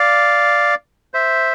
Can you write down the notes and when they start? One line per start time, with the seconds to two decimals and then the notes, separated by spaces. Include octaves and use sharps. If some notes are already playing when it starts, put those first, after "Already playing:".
Already playing: D5 F5
1.14 C5 E5